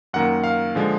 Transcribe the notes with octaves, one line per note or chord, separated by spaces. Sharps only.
F#2 D#3 A#3 F#5
F5
D3 F3 G#3